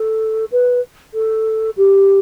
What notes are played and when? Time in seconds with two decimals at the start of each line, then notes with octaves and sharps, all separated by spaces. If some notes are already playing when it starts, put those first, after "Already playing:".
Already playing: A4
0.52 B4
1.14 A4
1.77 G4